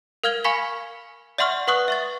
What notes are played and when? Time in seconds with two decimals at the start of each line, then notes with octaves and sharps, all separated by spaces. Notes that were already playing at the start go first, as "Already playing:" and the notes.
0.24 A#4 F5 F6 G#6 G7
0.44 F5 G#5 B5 C#6 B6 G7
1.38 D5 E5 F#5 C6 C#6 F6
1.68 B4 F#5 C#6 D#6 F#6
1.88 E5 C#6 A6